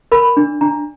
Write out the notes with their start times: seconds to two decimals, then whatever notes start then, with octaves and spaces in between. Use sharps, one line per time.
0.12 A#4 B5
0.37 D4
0.61 D4 A#5